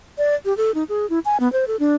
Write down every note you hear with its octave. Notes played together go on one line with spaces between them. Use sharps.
D5
G4
A4
D#4
G#4
E4
G#5
B3
C5
A4
D4